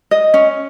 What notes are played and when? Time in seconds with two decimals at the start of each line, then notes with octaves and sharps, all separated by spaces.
0.11 D#5
0.34 C#4